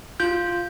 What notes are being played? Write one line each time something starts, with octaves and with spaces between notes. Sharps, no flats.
F4 G6